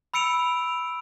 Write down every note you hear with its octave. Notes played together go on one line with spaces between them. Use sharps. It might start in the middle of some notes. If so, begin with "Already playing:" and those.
B5 E6 C#7 D7 F7